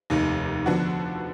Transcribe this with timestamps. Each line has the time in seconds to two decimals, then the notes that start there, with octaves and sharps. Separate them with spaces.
0.10 F1 D#2 D#3
0.66 D3 F3 B3 D4 F#4